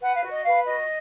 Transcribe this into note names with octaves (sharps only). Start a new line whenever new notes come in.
B4 F#5
F5
F#4
D#5
B4 F5
F#4 D#5